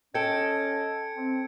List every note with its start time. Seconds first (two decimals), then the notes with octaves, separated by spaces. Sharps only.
0.14 C#4 A4 D#5 G5 G#6 C#7 D7
1.17 C4